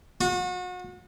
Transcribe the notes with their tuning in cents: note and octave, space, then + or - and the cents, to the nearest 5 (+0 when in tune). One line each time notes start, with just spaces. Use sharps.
F#4 -35